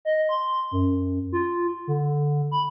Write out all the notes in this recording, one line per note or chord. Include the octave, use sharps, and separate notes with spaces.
D#5
C6
F#2
F4
D3
B5